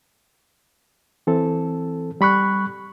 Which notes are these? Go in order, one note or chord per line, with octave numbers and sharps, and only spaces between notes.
E3 C4 A4
G3 B5 C#6 F#6